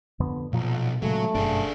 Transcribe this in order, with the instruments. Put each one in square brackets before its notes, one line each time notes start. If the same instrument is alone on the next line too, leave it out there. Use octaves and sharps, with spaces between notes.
[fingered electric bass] F2 D3 B3
[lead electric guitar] B1 [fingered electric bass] A#2 F3 F#3
[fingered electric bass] A#2 C#3 G#3 [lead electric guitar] F#3 [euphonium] A3
[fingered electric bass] G1 F#2 B2 [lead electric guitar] D4 G#4